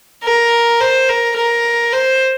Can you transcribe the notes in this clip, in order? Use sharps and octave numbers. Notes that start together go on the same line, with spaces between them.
A#4
C5
A#4
A#4
C5